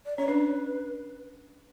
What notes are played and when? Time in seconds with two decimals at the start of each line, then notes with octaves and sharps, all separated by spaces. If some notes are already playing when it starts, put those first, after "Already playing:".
0.06 D5
0.17 C#4 C#5
0.27 D4 B4